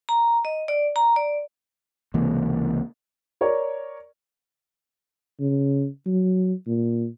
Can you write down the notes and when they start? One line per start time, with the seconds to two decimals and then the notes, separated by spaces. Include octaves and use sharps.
0.09 A#5
0.45 D#5
0.68 D5
0.96 A#5
1.16 D5
2.14 C#2 C3 E3 A#3
3.41 A#4 C#5 D5
5.40 C#3
6.07 F#3
6.67 A#2